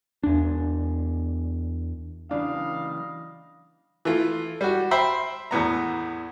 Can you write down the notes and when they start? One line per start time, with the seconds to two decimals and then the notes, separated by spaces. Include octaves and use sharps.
0.24 E2 D4
2.31 C#3 E3 F#3 G3 D4 B4 D#5 F5
4.05 E3 A3 F4
4.61 G3 F#4
4.91 C5 E5 G5 B5
5.51 E2 A2 B3 A#5